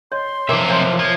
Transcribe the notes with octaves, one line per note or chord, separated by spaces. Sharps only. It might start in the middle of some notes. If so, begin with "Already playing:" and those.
C#5 D#5 C6
B1 C3 F3 A#4 D5 E5 D6
C#5 D5 F5 C6
F3 G#6